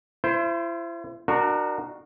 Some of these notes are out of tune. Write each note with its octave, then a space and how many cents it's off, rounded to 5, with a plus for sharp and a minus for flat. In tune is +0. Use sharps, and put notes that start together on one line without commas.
E4 +40 C5 +0
D4 +35 F#4 +0 A#4 +5